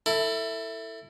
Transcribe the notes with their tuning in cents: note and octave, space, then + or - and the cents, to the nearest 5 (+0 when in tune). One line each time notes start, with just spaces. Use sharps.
E4 +0 A4 +25